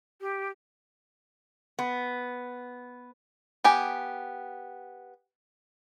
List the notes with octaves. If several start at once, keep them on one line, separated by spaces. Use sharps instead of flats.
G4
B3
B3 G4 G#5